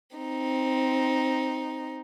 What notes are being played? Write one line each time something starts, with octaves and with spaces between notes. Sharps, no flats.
C4 D#4